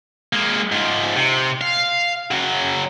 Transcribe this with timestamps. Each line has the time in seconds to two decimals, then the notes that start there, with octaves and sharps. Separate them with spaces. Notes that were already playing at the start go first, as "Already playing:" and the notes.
0.33 G#3 A#3
0.72 G#2 F3
1.16 C3
1.61 F5
2.31 C#3 F#3